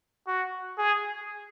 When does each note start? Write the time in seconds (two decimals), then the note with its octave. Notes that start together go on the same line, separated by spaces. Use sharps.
0.27 F#4
0.78 G#4